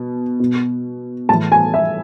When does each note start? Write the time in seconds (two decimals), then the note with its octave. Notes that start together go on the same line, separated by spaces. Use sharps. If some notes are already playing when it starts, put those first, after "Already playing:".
Already playing: B2
0.40 B2
1.29 A2 E3 A5
1.52 G#5
1.74 E5